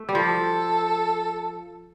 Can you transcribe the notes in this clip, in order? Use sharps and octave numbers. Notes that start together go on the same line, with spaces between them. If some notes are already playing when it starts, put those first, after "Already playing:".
Already playing: A3
G3
F3 A4